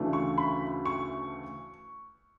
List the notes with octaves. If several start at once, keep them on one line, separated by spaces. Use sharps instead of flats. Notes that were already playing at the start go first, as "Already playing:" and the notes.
Already playing: D2 C#3 E3 A3 D4
C#6
B5
C#6